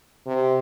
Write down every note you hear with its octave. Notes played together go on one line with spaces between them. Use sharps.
C3